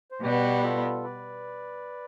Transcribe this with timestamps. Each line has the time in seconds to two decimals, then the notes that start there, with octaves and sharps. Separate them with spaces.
0.12 C5
0.22 B2 G3 B3 G4 B4
0.63 F4 A4
1.04 B4 D5